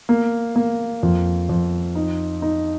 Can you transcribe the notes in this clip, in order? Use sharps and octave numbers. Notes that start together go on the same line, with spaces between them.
A#3
A#3
F2
F2
D#4
D#4